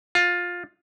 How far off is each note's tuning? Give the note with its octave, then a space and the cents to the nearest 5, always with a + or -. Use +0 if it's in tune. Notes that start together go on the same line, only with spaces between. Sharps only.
F4 +15